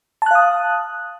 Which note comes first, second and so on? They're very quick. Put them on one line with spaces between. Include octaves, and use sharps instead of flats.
A5 F#6 F5 D#6